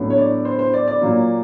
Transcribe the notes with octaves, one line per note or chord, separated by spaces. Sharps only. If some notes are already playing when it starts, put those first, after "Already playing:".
Already playing: A2 F#3 B3 D4
C#5
D5
C5
C5
D5
D5
A#2 F#3 A#3